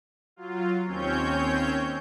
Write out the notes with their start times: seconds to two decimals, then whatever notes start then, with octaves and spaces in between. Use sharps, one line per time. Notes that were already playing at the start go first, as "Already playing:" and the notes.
0.36 F#3 F4
0.85 D#2 C4 C#4 C#5 G6